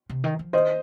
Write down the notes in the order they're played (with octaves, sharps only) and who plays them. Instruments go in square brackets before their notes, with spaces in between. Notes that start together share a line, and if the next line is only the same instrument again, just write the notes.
[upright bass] C3
D#3
F3
[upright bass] D#3 [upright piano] C5 D#5